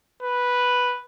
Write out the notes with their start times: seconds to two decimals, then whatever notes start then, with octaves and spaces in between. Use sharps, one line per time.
0.23 B4